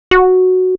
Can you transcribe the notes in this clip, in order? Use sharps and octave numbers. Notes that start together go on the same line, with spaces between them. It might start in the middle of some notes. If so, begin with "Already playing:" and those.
F#4